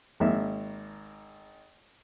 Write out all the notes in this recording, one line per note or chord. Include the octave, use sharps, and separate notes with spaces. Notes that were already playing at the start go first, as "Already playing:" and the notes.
G#1 A#3 E5